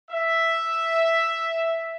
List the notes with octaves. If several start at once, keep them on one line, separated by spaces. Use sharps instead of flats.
E5